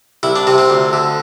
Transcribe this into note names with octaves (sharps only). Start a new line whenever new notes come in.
C2 E4
D4
C3 C4
C4
D2
D3